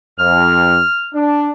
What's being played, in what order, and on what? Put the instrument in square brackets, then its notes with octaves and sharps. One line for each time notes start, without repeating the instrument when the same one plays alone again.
[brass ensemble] F2 [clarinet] F6
[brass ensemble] D4